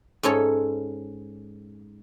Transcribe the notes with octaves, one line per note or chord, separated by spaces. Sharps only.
G#2 C#4 A4 C#5